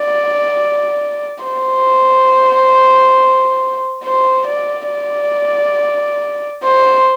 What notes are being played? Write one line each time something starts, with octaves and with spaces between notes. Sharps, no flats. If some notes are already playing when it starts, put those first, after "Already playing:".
Already playing: D5
C5
C5
D5
D5
C5